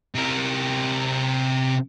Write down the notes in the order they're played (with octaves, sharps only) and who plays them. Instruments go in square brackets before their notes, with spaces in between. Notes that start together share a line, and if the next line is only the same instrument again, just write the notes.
[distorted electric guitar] C3 A#4